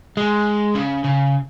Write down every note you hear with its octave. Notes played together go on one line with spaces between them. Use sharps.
G#3
C#3
C#3